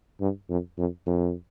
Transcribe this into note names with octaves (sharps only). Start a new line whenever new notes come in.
G2
F2
F2
F2